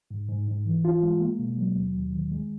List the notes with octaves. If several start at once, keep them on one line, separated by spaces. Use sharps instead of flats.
G#2
G#2
G#2
E3
F4
G#3
A#3
B2
F#3
D#2
D#2
D#3
G#3